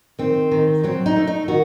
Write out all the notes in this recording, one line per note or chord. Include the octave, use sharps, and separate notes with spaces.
D#3 C4
D#3
F#3 C4
D#4
A3
D#4
D#3 F#4